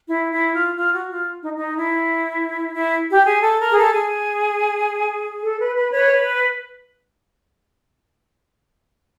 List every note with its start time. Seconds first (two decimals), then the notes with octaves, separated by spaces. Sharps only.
0.08 E4
0.32 E4
0.53 F4
0.76 F4
0.92 F#4
1.09 F4
1.43 D#4
1.57 D#4
1.76 E4
2.75 E4
3.09 G4
3.26 G#4
3.43 A4
3.59 A#4
3.71 G#4
3.76 A4
3.93 G#4
5.43 A4
5.60 B4
5.76 B4
5.92 B4 C#5
6.10 B4